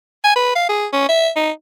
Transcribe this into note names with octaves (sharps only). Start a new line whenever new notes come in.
G#5
B4
F5
G#4
C#4
E5
D#4